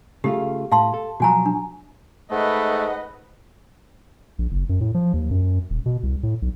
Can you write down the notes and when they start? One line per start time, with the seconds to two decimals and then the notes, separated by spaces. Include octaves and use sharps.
0.24 C#3 A3 F4 G4
0.72 A2 F5 A5 C6
0.94 A4
1.20 B2 F3 F#3 F#4 G#5 A#5
1.46 D4
2.31 G#2 A3 B4 D#5 F#5
4.39 A#1
4.51 F#1
4.69 F#2
4.81 A2
4.94 F3
5.13 D#2
5.31 F#2
5.70 D#1
5.86 B2
6.03 C2
6.23 A2
6.42 B1